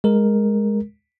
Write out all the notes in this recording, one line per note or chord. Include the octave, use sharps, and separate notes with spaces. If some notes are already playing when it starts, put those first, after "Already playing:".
G#3 A#4